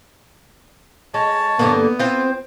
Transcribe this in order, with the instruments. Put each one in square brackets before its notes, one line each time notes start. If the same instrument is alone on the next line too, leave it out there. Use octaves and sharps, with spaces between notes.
[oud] G#3 [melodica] C#5 A5
[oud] G2 D3 A#3 [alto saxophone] B3
[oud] C4 F4 [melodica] C5